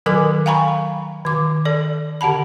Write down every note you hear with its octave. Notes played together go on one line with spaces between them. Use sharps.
D#3 F#3 A4 A#4 G#5 D6
F5 G5 G#5 A#5 B5 C#6
D#3 D6
A4 D5
D3 G4 F#5 A5 B5